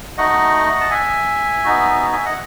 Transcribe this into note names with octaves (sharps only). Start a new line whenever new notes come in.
A3 D#4 F#4 D#5 F#5
A5
E5 G#5
B3 D#4 F#4
E5 G#5
D#5 F#5